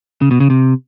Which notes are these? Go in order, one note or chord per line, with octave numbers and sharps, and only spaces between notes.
C#3
B2
C#3
C3